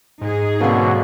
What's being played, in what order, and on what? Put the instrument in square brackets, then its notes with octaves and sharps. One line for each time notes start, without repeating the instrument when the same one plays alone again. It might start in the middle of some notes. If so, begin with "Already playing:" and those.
[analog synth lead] G#2 [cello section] D#4 G#4
[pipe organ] B2 D3 F#3 [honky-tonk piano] A#3 C4